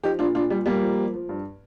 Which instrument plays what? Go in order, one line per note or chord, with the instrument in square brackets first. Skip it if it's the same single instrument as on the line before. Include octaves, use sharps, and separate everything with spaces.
[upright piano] F3 D#4 G4
A#2 D4 F4
A#2 D4 F4
A#2 G3
A#2 G3 A#3
F3
F3
F3
G2